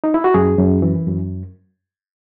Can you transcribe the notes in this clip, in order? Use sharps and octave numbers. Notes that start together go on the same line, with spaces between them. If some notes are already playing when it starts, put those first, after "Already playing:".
D#4
E4
F#4
F#2 G#4
F#2
E3
F#2